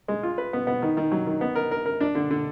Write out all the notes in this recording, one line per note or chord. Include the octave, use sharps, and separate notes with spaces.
G#3
F4
B4
B3
B3
D#3
D#3
F#3
D#3
B3
A#4
A#4
A#4
D4
D3
D3